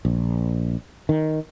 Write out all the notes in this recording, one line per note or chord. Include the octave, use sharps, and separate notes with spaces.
A#1
D#3